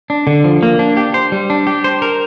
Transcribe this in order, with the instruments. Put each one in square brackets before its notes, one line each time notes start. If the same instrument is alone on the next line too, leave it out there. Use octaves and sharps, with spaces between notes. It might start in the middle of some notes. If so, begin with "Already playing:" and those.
[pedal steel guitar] D4
D3
F3
A#3
D4
G4
C5
G3
D4
G4
C5
A#4